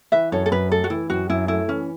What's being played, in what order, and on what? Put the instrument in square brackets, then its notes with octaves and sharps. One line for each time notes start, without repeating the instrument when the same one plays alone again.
[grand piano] E3 [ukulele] B4 E5
[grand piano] F#2 [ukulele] A4 C#5
[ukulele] A4
[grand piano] F#2 [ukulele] B4
[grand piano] A3 [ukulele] A4
[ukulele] F#4
[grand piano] E3 [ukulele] E4
[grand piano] F#2 [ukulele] F#4
[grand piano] F#2 [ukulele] E4
[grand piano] A3 [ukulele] E4
[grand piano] E3 [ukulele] C#4